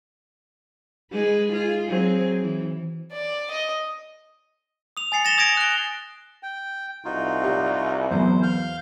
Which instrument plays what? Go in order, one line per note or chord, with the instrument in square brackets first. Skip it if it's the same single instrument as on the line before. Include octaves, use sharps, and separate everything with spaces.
[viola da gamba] G#3 G#4 B4
F4 G#4
F#3 C4 G#4
E3
[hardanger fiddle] D5
D#5
[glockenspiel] D#6 F7
G#5 A6 C7 C#7
A6 A#6 E7 F7 G7
D#6 G#6 A#6 D7
F#6 G7
[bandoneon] G5
[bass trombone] C2 [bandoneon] D#4 F4 F#4
[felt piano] G4 D5
[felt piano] E2 F#3 B3 [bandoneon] C5
[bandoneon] F5 F6 G6